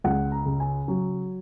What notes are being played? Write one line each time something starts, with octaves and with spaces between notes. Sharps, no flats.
C#2 F#5
A#5
C#3
G#5
F#3